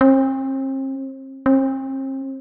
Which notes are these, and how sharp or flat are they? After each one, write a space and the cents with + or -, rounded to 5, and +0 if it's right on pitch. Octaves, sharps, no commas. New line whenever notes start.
C4 +40
C4 +40